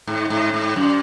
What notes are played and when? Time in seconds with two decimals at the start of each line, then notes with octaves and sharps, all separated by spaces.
0.07 G#2
0.30 G#2
0.54 G#2
0.76 F#2